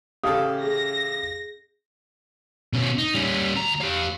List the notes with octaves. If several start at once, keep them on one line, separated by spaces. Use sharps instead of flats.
A1 C#3 G4 A4 F5 D#6
G#4 A#6
B2 C#4
D#4
G3 C#4
D2 A#5
G4 F5